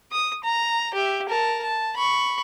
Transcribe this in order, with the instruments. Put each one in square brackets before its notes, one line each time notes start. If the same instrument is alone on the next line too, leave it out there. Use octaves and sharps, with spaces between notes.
[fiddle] D#6
A#5
G4 E5
A#4 A5
A5
B5 C#6